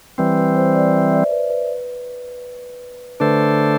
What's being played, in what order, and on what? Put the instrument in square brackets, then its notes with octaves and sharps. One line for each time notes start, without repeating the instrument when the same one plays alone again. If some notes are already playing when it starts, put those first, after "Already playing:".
[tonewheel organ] E3 G3 C4 [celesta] B4
[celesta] B4
C5
D5
E5
D5
B4
B4
[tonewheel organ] D3 A3 D4 A4 C5 [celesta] B4